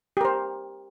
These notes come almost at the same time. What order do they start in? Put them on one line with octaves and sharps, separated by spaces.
G4 A#4 C5